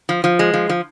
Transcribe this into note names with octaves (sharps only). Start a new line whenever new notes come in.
F3
F3
G#3
F3
F3